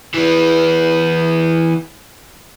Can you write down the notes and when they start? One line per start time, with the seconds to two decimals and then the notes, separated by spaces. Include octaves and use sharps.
0.14 E3 B3